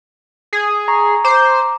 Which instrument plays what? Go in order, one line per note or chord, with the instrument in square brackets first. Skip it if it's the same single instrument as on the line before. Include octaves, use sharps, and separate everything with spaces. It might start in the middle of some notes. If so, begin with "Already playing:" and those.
[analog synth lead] G#4
[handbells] A#5 C#6
[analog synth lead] C5 [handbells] A#5 D6